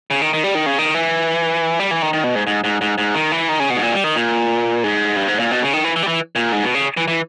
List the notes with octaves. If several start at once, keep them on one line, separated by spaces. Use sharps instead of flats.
C#3
D#3
D#3
G3
D#3
C#3
D#3
E3
G3
E3
D#3
D#3
B2
G#2
G#2
G#2
G#2
G#2
D#3
E3
D#3
C#3
B2
G#2
A#2
G3
D#3
A#2
G#2
G2
G#2
A#2
B2
C#3
D#3
E3
E3
G3
E3
A#2
G#2
B2
C#3
E3
E3